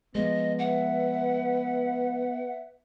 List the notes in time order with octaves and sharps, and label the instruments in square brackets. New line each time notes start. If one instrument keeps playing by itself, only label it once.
[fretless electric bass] F3 G#3 [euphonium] B3 [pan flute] D#5
[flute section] B4 E5 [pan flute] F#5